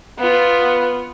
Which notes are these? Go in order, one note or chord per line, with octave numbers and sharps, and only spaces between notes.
B3 F4